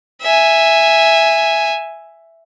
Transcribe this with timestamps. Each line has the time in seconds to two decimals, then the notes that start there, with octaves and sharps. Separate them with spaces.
0.22 E5 G#5